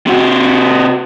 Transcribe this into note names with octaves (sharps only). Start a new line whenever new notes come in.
C3 F#4